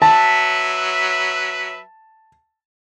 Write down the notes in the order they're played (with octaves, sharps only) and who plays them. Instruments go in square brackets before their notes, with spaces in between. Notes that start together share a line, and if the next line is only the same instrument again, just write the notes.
[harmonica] F#3 B4 E5 [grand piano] A5